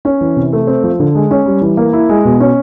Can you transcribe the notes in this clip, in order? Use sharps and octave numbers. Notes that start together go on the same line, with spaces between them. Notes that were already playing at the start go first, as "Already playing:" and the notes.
C#4
E3
C3
A3
C4
F3
D3
G#3
C#4
G3
E3
A#3
E4
G#3
B2
C#4